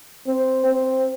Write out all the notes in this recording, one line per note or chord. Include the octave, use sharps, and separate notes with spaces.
C4
C4